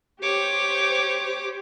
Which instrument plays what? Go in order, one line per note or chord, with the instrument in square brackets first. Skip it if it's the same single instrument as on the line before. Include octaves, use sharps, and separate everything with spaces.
[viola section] G4 C5 [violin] C#5 D6